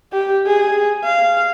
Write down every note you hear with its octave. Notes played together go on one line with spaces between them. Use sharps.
G4
G#4
F5